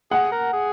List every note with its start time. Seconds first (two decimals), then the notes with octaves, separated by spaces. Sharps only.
0.11 G#4 F#5
0.32 A#4
0.53 G#4